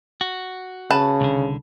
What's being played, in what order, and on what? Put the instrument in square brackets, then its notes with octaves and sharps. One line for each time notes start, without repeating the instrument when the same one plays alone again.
[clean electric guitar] F#4
[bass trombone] C#3 [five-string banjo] B4 A5
[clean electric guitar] C2 D3